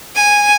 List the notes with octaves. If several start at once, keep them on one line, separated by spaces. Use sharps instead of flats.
G#5